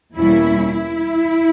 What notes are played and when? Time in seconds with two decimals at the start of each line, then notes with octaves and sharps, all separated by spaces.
0.15 E2 B2 G3 A#3 C#4 E4
0.72 E4